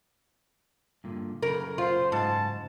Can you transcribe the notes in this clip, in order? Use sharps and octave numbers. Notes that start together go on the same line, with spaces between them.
G2 A#2 D3
F#2 C#3 A#4 B5
F4 C5
G#2 A5